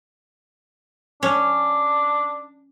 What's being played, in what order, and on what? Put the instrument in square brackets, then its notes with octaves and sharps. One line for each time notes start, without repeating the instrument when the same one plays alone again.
[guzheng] C#4 [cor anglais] D4